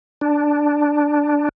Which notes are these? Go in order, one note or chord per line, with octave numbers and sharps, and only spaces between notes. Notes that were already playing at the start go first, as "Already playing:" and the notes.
D4